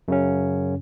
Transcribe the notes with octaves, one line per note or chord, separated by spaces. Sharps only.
F#2 C#3 C#4